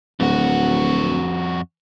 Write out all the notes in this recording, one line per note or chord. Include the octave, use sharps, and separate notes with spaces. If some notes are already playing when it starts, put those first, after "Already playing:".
D1 F2 F#4